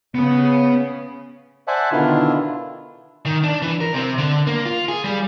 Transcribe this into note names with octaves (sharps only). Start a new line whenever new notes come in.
C#3 B3 B4
C5 D5 E5 F#5 G#5 A5
B2 D3 D#3 D4 E4 F4
D#3
D4
E3
A#4
C3
D3
A#3
F4
G#4
G3